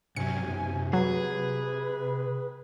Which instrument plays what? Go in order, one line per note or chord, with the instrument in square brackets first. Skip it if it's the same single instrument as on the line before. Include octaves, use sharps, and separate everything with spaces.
[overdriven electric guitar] G2 F#3 [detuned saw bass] C3 [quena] G#5 [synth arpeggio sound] C#7
[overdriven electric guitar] B1 F#2
[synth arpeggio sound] F#3 [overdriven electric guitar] G#4 [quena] B4